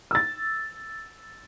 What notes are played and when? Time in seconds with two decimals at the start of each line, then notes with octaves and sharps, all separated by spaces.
0.11 E6 A6